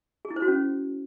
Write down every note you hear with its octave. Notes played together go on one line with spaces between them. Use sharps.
G#4
E4
C5
F#4
C#4